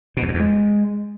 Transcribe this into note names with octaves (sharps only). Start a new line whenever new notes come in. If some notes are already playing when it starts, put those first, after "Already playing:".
B2
E2
F#2
E2
G#3